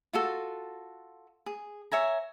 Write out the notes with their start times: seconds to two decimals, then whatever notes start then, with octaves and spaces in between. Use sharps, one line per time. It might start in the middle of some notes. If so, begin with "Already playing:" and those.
0.13 F4 F#4 A4
1.46 G#4
1.92 C#5 E5 G#5 A#5